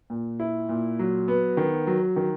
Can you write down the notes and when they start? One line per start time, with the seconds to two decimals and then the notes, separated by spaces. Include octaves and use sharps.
0.10 A#2
0.40 E4
0.69 A#2
0.99 F#3
1.28 B3
1.57 D#3
1.87 F#3
2.16 D#3